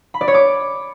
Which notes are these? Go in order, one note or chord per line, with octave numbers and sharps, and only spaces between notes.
B5
D5
C#5
D6